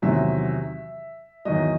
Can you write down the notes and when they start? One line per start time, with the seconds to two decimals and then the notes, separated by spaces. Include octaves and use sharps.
0.02 E2 C3 D#3 F#3 E5
1.45 E2 D#3 F#3 D#5